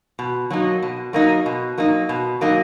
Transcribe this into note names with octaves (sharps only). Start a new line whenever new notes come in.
B2
F#3 A#3 D#4
B2
F#3 A#3 D#4
B2
F#3 A#3 D#4
B2
F#3 A#3 D#4